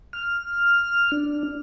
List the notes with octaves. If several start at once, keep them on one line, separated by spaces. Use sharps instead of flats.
F6
D4